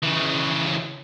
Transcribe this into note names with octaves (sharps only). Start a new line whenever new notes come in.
C#3 E3